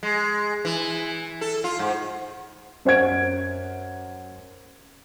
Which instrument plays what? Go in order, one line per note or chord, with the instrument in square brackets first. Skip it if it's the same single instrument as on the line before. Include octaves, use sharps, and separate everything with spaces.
[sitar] G#3
E3
A4
F4
G#2
[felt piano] F#2 C5 F#5 G#6 D7